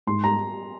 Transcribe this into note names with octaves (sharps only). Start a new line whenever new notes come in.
G#2 C6
A#5